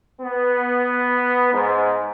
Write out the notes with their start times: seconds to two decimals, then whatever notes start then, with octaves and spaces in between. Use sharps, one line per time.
0.21 B3
1.53 G#2